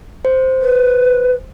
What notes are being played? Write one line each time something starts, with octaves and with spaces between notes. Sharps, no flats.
C5
B4